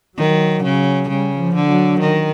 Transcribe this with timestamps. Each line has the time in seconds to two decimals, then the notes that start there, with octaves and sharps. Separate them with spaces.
0.18 D#3 F#3
0.63 C#3
1.08 C#3 G3
1.39 F3
1.55 D3
1.70 F#3
2.00 D#3